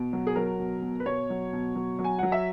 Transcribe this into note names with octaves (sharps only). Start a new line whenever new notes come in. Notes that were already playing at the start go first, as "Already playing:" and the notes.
Already playing: B2
F#3
G#4
F#3 A#4
B2
B2
B4
B2 C#5
F#3
B2
F#3
F#3
G#5
F#3 F#5
E5